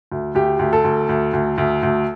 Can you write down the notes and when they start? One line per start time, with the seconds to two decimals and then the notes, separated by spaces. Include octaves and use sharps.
0.12 D2
0.35 D2 G4
0.59 D2
0.73 A4
0.84 D2
1.09 D2
1.33 D2
1.58 D2
1.83 D2